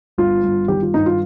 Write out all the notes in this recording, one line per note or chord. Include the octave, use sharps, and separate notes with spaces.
G1 F4
G1
D#3 G4
F4
G2 D#4
F4